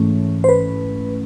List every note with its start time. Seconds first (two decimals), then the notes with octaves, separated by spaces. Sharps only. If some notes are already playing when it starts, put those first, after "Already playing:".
Already playing: G#2 E3 A3 C#4
0.44 C5
0.49 B4